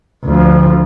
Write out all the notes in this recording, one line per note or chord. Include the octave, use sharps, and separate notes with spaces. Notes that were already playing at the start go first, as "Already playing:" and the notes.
D2 F3